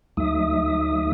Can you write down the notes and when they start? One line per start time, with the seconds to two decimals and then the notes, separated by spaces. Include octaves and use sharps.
0.17 D2 F#3 A3 D#4 E5 D#6